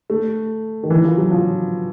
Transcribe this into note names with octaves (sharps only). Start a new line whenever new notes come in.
A3
D#3
E3
F3
F#3
F3